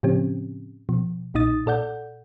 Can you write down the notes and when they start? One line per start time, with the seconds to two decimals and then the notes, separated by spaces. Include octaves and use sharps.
0.03 A2 C#3 F3 C4 C#4 G4
0.89 B2 F3
1.34 B1 A#2 D#4 D#6 A6
1.66 A#2 A4 D5 F#5 G6